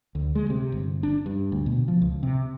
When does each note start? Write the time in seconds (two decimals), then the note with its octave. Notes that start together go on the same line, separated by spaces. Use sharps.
0.15 D2
0.35 G#3
0.50 C3
0.72 G1
1.03 D4
1.26 G2
1.52 D2
1.66 B2
1.88 F3
2.02 C#2
2.23 C3